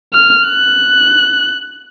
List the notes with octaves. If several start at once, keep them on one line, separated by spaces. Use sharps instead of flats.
F6
F#6